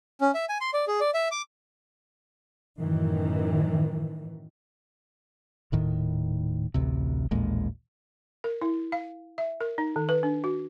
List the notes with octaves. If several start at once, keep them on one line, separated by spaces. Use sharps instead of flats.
C#4
E5
G#5
C6
D5
G#4
D5
E5
D6
F#2 A2 D#3 E3
D#1 A2 D#3
A1 D2 C3
A1 D#2 A#2 G#3
A#4
E4
F5
E5
A#4
D#4
D#3
B4
D4
F#4